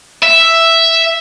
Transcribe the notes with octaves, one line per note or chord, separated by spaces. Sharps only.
E5